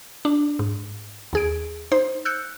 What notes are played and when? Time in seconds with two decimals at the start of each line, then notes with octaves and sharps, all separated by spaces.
0.25 D4
0.59 G#2
1.33 D#2 G#4 D7
1.92 D#4 C5
2.25 E6 F#6 G6 C#7